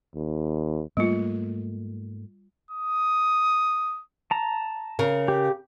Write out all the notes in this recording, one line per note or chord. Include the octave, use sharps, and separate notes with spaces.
D#2
G#2 G3 A3 A#3 F4
D#6
A5 A#5
C#3 A#4
G4